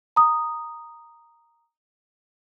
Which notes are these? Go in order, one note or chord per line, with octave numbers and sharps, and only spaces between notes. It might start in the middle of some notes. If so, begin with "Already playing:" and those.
A#5 D#6